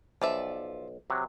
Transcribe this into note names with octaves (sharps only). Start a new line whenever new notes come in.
B1 F3 D5 E5
C3 F#3